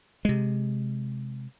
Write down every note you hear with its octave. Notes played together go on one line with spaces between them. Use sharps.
C3 G#3